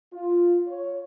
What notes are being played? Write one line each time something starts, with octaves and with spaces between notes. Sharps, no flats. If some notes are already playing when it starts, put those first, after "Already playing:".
F4
C#5